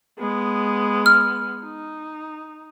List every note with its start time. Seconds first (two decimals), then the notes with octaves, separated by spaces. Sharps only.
0.19 G#3 B3
1.06 F6
1.63 D#4